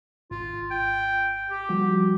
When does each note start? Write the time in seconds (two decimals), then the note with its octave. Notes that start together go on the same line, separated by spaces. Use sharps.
0.31 G#1 F4
0.71 G5
1.50 G4
1.69 F3 G3 F#4